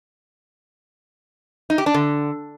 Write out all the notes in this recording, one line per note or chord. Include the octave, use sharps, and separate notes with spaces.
D#4
G4
D4
D3